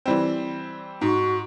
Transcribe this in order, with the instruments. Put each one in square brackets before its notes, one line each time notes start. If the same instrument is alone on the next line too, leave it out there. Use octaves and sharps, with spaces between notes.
[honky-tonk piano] E3 G3 C4
[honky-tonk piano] G#2 [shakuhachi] F#4